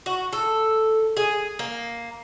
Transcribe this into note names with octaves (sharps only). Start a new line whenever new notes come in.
F#4
A4
G#4
A#3